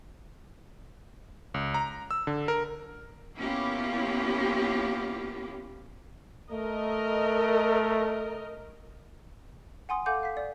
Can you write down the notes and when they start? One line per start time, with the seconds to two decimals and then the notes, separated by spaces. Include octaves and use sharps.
1.54 C#2
1.74 A#5
2.11 E6
2.27 D3
2.48 A#4
3.37 A#3 B3 C#4 E4 F4 G4
6.52 A3 A#4 D#5
9.89 F#5 G#5 C6 D#6
10.06 A4 F5 F#5 G#5 D6 G6
10.23 F5 B6
10.37 D5